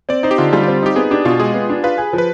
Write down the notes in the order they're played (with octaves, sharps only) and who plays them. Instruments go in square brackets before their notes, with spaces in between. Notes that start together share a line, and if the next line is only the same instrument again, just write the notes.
[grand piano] C4 [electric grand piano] D5
[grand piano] D#4 [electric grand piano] C5
[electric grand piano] G4
[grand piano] D3 [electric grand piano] F4
[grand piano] G3 [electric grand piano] F4
[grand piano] C4 [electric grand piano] F4
[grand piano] D#4 [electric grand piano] G4
[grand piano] B3 [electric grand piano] G#4
[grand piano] D4 [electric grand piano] G4
[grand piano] B2 [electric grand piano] F4
[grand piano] G#3 [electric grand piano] G#4
[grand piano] B3
D4
[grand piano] F4 [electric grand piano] B4
[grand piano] G#4
F3
[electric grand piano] B4